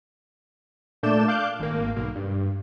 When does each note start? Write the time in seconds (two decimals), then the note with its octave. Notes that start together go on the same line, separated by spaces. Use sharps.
1.03 A#2 A3 D4 D5 G6 E7
1.28 F5 D6 F#6 G6
1.60 G#1 A#3
1.96 B1 A#3
2.15 G2